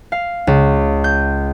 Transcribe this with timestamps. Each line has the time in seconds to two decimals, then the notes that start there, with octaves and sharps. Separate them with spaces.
0.12 F5
0.47 C#2
1.04 G6